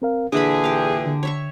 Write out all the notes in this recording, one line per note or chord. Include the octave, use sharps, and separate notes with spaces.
C4 A#4 F5
A#2 D3 E3 D4 G#4 B5
G4 F5
D3
C#5 E5 C#6